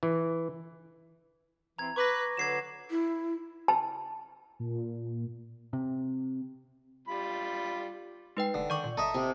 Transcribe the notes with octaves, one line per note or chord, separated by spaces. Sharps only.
E3
E3 C4 A#5 G#6
B4 C#6 D6 A#6
D3 F#3 B4 G#6 C7 E7
E4
A5
A#2
C3
G3 F4 B5
G#3 D#4 B4 G5
F1 D3
D#3 D5 C#6 D6
A#2
G1 A4 D#5 E5 A#5
C3